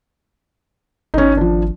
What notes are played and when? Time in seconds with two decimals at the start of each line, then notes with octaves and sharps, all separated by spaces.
1.14 G#1 C#4 D#4
1.37 F3 D4